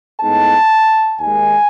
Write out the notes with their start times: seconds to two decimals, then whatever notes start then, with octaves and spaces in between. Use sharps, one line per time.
0.21 A2 G#3 B3 D#4 A5
1.20 D#2 D#3 G#3 G#5